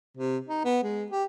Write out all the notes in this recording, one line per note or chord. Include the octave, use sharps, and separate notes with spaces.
C3
D#4
B3
G#3
G4